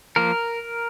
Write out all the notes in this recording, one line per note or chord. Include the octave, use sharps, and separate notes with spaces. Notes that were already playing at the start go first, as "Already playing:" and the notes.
F3 A#3 A#4